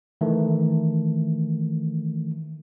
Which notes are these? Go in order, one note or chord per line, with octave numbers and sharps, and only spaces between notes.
D#3 E3 A3